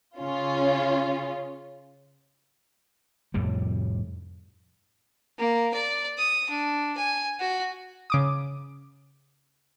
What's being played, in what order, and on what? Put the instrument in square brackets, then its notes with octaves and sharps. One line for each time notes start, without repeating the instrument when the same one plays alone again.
[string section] C#3 C#4 F4
[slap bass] F2 A2 C3 G3
[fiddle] A#3
D5
D#6
D4
G#5
F#4
[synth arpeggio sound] C#3 D6 D#6